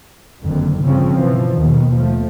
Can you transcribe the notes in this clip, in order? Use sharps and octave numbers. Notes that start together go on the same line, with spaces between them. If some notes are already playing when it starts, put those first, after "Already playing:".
F#1 F2 D3 D#3
G1 C#3 F3 C4 C#4
B2 E3 F3
D#2 B2 D#3
F3 A3